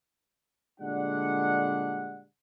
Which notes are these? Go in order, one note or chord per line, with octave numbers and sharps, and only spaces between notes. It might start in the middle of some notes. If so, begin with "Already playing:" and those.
A#2 D3 G3 G#3 D4 F#5